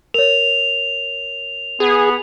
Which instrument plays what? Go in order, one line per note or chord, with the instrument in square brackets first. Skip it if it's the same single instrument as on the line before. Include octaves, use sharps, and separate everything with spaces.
[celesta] A#4 C#5 [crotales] F7
[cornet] B3 [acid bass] G#4